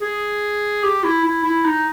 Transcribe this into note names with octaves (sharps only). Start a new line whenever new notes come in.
G#4
G4
E4
E4
E4
D#4